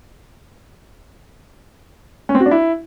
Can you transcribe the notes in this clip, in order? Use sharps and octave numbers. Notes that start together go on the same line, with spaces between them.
C#4
C4
F#4
D4
E4